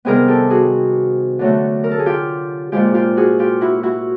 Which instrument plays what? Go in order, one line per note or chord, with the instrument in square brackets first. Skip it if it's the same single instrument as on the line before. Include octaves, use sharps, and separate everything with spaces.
[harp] C3 D#3 G3 B3 G#4 A#4
G4 A4
F#4 G#4
D3 F#3 A3
A#4
A4
G#4
F4 G4
A#2 F3 G#3 F4 G4
F4 G4
F#4 G#4
F4 G4
E4 F#4
E4 F#4